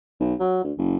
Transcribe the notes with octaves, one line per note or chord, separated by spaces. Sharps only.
B1
F#3
D2
F#1